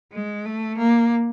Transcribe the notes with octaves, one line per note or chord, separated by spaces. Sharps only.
G#3
A3
A#3